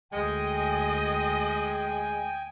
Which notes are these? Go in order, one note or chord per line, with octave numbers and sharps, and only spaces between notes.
D2 G#3 D#5 G5 G#5